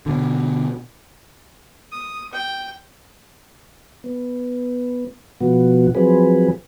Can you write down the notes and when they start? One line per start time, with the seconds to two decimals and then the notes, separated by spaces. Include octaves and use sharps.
0.06 B2 D3
1.92 D#6
2.33 G5
4.04 B3
5.40 B2 F3 B3 F#4
5.95 F3 F#3 C4 G#4 B4